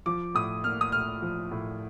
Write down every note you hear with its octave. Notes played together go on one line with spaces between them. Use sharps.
F3 D6
A2 D#6
A#3 F6
D#6
A2 F6
F3
A2